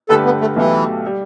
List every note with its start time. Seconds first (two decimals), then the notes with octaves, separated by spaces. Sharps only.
0.09 G2 D3 A3 G4 A4 B4
0.25 B3
0.41 A3
0.56 B1 B2 E3 A3 G4
1.07 G3